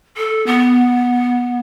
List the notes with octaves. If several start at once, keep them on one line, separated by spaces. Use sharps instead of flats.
A4
B3